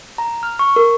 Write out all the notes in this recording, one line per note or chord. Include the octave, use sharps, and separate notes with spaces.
A#5
F6
C#6
A#4